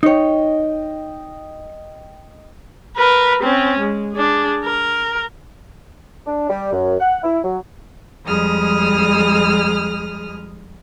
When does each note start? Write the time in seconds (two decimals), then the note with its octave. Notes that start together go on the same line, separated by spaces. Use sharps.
0.03 D#4 C#5 D#5 G5
2.97 A#4 B4
3.43 C4 C#4
3.79 G#3
4.13 D4 G#4
4.64 A#4
6.27 D4
6.50 G3
6.73 F#2
7.00 F#5
7.23 E4
7.44 F#3
8.26 F2 G3 G#3 G#4 D#6 F6